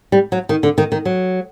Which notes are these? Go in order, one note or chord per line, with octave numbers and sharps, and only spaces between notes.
G3
F#3
D#3
D3
D#3
D#3
F#3